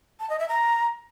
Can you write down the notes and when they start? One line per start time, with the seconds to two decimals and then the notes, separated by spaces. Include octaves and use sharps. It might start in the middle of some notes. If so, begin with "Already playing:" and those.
0.20 A5
0.30 D#5
0.39 E5
0.49 A#5